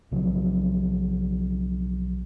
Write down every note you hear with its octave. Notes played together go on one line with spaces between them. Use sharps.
B1 C#3 F3 F#3